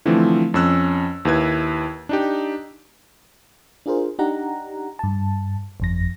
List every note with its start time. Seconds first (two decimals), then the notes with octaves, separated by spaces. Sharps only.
0.05 D3 E3 F3 A3 C4
0.54 F2 C#4 E6 F#6
1.25 D#2 E4 B4 G#6
2.09 D4 D#4 G4
3.86 D4 F4 G#4 A#4 C5
4.19 D4 D#4 G4 F#5 A#5
4.99 G2 A5
5.80 G1 F2 A#6